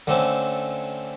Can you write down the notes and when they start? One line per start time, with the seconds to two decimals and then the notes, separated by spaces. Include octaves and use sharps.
0.07 D3 A3 C4 C#4